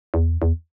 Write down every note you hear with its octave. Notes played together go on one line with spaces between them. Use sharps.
E2
E2